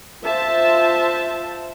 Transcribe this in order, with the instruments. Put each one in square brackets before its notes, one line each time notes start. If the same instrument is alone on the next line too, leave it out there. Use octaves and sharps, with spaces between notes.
[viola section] F4 C5 E5 A5